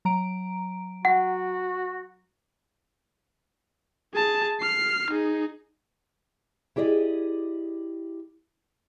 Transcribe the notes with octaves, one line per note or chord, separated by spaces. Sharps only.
F#3 A#5 D7
F#4 F#5
G#4 A5
F6 C7
D#4 G#4
E4 G4 G#4 D5 D#5